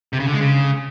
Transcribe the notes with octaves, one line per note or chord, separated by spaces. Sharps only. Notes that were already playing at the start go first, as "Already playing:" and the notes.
C3
C#3
D3
G#3
C#3